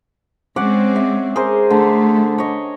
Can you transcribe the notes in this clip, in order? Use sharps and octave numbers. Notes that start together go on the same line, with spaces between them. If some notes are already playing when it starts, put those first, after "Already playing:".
G#3 C4 C#4 D5 F#5
E5
G#4 A#4 C5
D3 A3
C#5 D#5